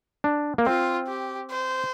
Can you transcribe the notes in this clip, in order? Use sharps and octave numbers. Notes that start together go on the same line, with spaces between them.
D4
A#3
C4 F4
G4
C5